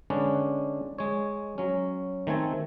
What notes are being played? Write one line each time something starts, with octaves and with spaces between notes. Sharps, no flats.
D3 G#3 C#4 D4 B4
G#3 C#5
F#3 C#4
D#3 A3 C4 G#5 A5